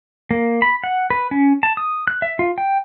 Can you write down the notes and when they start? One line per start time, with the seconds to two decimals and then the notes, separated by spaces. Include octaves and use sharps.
0.31 A#3
0.62 B5
0.84 F#5
1.10 B4
1.31 C#4
1.63 A5
1.77 D#6
2.08 F#6
2.22 E5
2.39 F4
2.58 G5